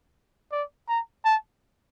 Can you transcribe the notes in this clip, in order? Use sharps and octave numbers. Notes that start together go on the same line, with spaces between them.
D5
A#5
A5